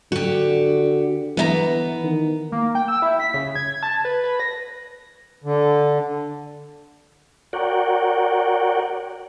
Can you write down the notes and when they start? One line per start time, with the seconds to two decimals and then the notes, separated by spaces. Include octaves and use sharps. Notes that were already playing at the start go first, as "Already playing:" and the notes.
0.12 D3 F#4 G4
1.37 E3 B3 E5 A#5
2.04 D#3
2.52 A#3
2.75 G5
2.88 E6
3.02 E4
3.20 B6
3.34 C#3
3.55 G#6
3.83 A5
4.05 B4
4.24 B4
4.40 A#6
5.44 D3
7.53 F#4 A#4 C#5 D5 F#5 G5